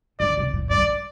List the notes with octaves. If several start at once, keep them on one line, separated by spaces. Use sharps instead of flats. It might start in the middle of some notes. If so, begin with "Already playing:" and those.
D3 D5
C3
A2
G2 D5